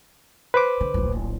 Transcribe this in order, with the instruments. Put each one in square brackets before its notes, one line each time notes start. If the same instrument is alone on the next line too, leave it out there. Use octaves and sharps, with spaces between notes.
[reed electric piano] B4 C5 D6
[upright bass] D3
D1 A#1